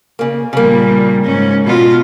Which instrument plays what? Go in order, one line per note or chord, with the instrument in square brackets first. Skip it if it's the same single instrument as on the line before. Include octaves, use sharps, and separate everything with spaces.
[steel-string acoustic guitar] C#3 A#3
[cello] A#2 G3 [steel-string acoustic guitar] C#3 A#3
[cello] G#2 C#4
B2 F4